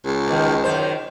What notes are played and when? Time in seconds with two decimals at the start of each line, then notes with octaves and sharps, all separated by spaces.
0.06 C#2
0.28 B2 D#3
0.64 F#2 D#3 C5